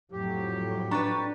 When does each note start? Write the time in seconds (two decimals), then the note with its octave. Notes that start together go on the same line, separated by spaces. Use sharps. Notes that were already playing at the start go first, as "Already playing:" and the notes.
0.12 F2 A2 F#3 G4
0.91 D4 B4 A#5 C#6 A6